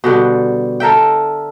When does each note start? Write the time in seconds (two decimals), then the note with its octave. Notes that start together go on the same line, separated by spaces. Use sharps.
0.04 B2 D3 G3
0.80 A4 A#4 E5 G5